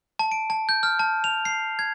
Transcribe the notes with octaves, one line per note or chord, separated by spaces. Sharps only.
A5
D7
A5
G6
F6
A5
F7
C7
G#6